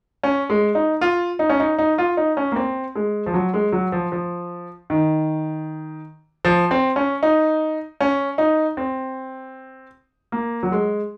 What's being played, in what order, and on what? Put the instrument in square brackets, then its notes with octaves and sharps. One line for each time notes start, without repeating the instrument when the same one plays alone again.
[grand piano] C#4
G#3
D#4
F4
D#4
C#4
D#4
D#4
F4
D#4
C#4
A#3
C4
G#3
F3
F#3
G#3
F#3
F3
F3
D#3
F3
C4
C#4
D#4
C#4
D#4
C4
A#3
F#3
G#3